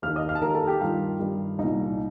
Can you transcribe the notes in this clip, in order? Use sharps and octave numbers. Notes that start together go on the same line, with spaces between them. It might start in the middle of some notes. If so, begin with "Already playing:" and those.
D#2 D#3 F5 F6
D#5 D#6
F5 F6
A5
D#2 D#3 A#4 A#5
A4 A5
G4 G5
G2 D#3 F4 F5
G2 D#3
C2 A#2 D#4 D#5